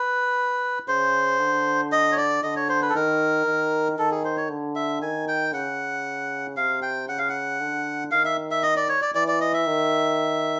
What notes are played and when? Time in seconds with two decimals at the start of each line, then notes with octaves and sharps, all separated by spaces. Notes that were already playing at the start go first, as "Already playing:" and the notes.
Already playing: B4
0.88 C#3 C5
1.40 D3
1.92 D#5
2.12 C#5
2.17 D5
2.43 D3 D#5
2.56 C#5
2.69 C5
2.82 B4
2.90 A4
2.95 D#3 A#4
3.46 D#3
3.98 D#3 A4
4.11 G#4
4.25 C5
4.37 C#5
4.50 D3
4.75 E5
5.02 D#3 G#5
5.28 G5
5.53 C#3 F#5
6.56 C3 F5
6.82 G5
7.09 C#3 F#5
7.18 F5
7.29 F#5
7.61 D3
8.11 D#3 F5
8.25 E5
8.51 E5
8.63 D#5
8.76 D5
8.89 C#5
9.02 D5
9.15 E3 D5
9.28 D5
9.41 D#5
9.54 E5
9.67 D#3